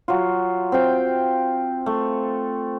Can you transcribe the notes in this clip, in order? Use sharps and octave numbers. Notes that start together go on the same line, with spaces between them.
F#3 F4
C4 F5 G5
A3